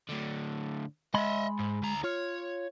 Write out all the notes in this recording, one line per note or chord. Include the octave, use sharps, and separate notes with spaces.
A2 D3
G#3 D#5 E5 B5 C6
G#2
D2 A#5
F4 C#5